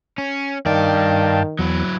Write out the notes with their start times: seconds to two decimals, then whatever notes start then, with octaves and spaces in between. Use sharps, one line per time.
0.18 C#4
0.66 G2 D#3 D5 F5 G5 A5
1.59 E2 F#3 E4